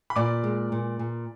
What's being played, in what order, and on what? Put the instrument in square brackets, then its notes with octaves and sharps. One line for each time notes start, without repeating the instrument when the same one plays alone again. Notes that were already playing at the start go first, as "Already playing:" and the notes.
[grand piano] B5
[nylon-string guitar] A#2 [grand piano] D5 D6
[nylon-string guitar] G#3
A#2
A#2